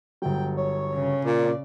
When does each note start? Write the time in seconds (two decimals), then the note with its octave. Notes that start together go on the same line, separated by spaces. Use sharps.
0.22 G1 F#3 G5
0.57 C#5
0.94 C#3
1.25 A#2 D5